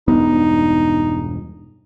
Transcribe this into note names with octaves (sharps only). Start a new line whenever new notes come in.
E1 G2 B3 D#4